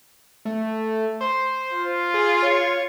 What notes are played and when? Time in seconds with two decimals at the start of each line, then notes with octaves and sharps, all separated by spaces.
0.45 A3
1.21 C5
1.73 F4
2.14 G#4
2.42 C#5